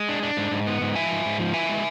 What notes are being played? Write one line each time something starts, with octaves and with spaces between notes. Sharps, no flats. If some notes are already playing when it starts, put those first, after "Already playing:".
Already playing: G#3
D4
D4
G#2
G#2
B3
G#2
F3 E5 G#5
G#2
G#2
F3
E3 E5 G#5
G#3